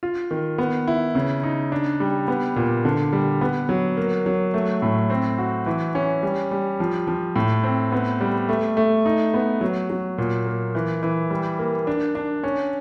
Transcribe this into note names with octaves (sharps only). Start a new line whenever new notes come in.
F4
D#3
B3
E4
C#3
D#4
D4
G3
B3
A#2
D3
G3
B3
F#3
A#3
F#3
A3
A2
C4
F#4
E3
C#4
G3
G3
F3
F3
A2
C4
B3
G3
A3
A3
D#4
B3
F#3
F#3
A#2
A#3
E3
E3
G3
A#3
D4
D4
C#4